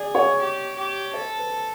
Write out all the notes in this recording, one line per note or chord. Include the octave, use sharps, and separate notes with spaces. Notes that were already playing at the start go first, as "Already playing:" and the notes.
Already playing: G#4 D5
C#5
G4
G4
A4 C5
B4